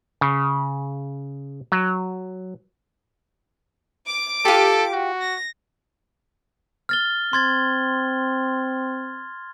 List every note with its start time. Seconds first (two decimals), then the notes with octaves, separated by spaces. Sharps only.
0.21 C#3
1.72 F#3
4.06 D6 D7
4.45 F4 G4 A4
4.92 F#4
5.21 A#6
6.89 F6 A6 G7
7.33 C4 C6 G#6 A6